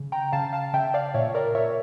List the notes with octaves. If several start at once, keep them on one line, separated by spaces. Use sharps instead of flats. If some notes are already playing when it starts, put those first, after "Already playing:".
Already playing: C#3
G5 A#5
C#3 F5 A5
F5 A5
C#3 E5 G5
D5 F5
A#2 C#5 E5
A#4 D5
A#2 C#5 E5